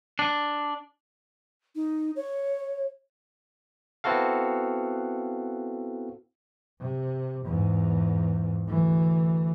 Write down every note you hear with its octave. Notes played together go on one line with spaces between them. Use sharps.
D4
D#4
C#5
B3 C4 E4 F#4 A4 F5
C3
E2 G#2
D2 E3